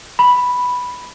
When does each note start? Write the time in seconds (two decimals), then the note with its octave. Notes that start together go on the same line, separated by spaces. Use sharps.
0.19 B5